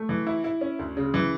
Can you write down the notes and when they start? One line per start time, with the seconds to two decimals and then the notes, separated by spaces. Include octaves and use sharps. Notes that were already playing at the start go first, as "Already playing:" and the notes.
Already playing: A3
0.09 E3
0.27 E4
0.44 E4
0.61 C#4
0.79 D2
0.97 C#3
1.14 E3